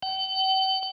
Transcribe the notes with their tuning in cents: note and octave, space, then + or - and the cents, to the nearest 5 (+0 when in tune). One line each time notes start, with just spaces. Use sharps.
G5 -45